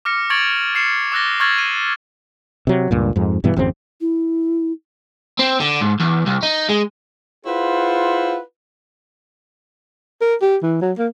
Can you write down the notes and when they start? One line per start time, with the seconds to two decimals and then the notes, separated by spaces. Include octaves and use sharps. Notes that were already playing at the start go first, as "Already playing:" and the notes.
0.05 D6 F6 A#6 C#7
0.30 C#6 G#6 A6 D7 F7 F#7
0.75 F6 C7 C#7 E7
1.12 D6 E6 F#6 A6 A#6 G7
1.40 C#6 E6 F6 G#6 A6 F#7
1.58 D#7
2.67 C3 F#3
2.91 C#2 G2 A#2
3.16 F2 G#2
3.44 G2 B2 E3 B3
3.56 G#1 F2 C#3 C4
4.01 E4
5.39 C4
5.60 D3
5.82 G#2
6.00 E2
6.27 C2
6.43 D#4
6.69 G#3
7.46 E4 F4 G#4 B4 C5 F#5
10.21 A#4
10.42 G4
10.62 E3
10.82 F#3
10.98 A#3